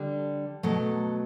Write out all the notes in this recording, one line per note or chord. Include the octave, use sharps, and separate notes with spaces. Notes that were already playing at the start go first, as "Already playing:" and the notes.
Already playing: D3 G3
B2 F#3 A3